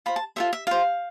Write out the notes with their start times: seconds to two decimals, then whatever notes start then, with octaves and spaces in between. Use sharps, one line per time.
0.06 F4 C5 B5
0.16 A5
0.36 F4 A4 C5 E5
0.53 E5
0.67 F4 C5 F5